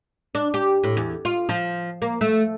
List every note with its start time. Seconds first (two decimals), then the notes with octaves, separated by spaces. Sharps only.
0.35 D4
0.54 G4
0.84 A2
0.97 E2
1.25 F4
1.49 F3
2.02 A#3
2.21 A3